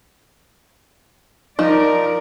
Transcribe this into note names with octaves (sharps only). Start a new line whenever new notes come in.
F3 D#4 A#4 D5